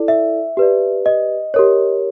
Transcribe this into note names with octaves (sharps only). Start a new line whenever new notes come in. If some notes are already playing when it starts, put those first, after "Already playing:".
Already playing: E4 A4 D5
E5
G4 B4 D5
D#5
G4 A#4 C#5